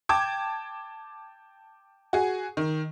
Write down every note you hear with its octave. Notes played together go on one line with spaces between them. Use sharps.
G5 A5 D6 G#6
F#4 G#4
D#3